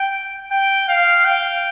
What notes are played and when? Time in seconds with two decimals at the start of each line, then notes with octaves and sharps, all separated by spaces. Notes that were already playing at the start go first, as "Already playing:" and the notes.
Already playing: G5
0.51 G5
0.89 F5
1.25 G5